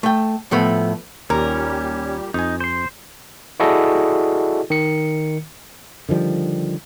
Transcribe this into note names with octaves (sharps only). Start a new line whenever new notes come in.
A3 G5
A2 F3 A3 B3
D#2 A#2 G3 C#4 G4 A#4
F2 D#4 G#5
C5 C6
E4 F#4 G#4 A4 D5 D#5
D#3 C#7
D3 D#3 F3 G3